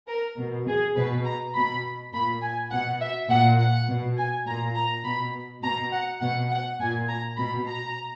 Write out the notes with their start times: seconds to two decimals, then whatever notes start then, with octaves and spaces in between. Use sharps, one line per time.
0.08 A#4
0.37 B2
0.67 G#4
0.96 B2 B4
1.25 A#5
1.54 B2 B5
2.13 A#2 B5
2.42 G#5
2.71 B2 F#5
3.00 E5
3.29 A#2 F#5
3.58 F#5
3.87 B2
4.17 G#5
4.46 A#2 A#5
4.75 A#5
5.04 B2 B5
5.62 B2 A#5
5.92 F#5
6.21 B2 F#5
6.50 F#5
6.80 A#2 G#5
7.09 A#5
7.37 B2 B5
7.67 A#5